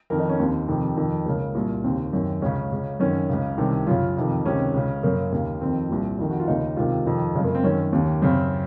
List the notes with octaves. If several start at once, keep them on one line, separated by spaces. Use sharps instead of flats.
F2 D#3 A#4
D#4
C#4
D#2 D#3 C4
F2 C3 D#3
F2 D#3
C#2 C#3 A#3
C2 A#2
D#2 C#3 C4
F#2 D#3
C#2 C#3 C#4
C#2 C#3
F#2 D#3 C#4
C#2 C#3
C2 C3 D#3
F#2 C#3 F4
F2 C3 D#3
C#2 C3 D#3 C#4
C#2 C#3
F#2 C#3 A#3
D#2 C#3
F2 D#3 C4
C2 A#2
F2 D#3
F#4
F4
D#2 C#3 D#4
C#2 C3 D#3 F4
F2 C3 D#3
F#2 C#3 G#3
A#3
C4
F#2 D#3 C#4
D#2 D#3
F#2 C#3 C4